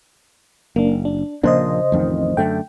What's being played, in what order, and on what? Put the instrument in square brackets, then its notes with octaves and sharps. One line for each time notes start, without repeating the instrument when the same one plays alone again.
[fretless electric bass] F#1 [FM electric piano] A#3 D4
[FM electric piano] D4
[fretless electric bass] A#1 A#3 D4 [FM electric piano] C#3 C5 D#5
[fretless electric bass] A1 F2 D#3
[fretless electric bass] F#2 D3 A3 [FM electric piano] G5